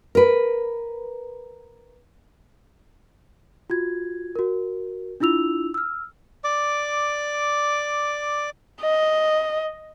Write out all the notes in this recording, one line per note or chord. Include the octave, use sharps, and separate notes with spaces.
A#4 B4
F4 F#4 G#6
F#4 A#4
D4 E4 F4 E6 F7
E6 F6
D5 D6
D#5